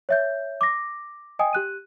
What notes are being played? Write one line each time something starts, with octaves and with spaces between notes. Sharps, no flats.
C#5 E5 G6
D6 A#6
D#5 G5 G#5 D#6
G4 F#6 D#7